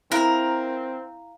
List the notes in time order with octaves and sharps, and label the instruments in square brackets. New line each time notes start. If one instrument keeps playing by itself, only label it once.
[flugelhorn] C4 [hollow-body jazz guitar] E4 [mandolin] A#4 [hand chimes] F5 A#5